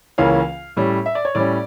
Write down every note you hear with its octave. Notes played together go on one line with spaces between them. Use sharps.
C#2 C#3 E3 A#3 C#4 F5
A2 G3 C#4
E5
D5
C#5
A2 G3 C#4 D5